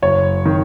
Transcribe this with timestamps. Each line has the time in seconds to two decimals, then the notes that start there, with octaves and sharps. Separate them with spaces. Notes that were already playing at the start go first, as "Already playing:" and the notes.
0.02 F#1 C#5
0.45 D#3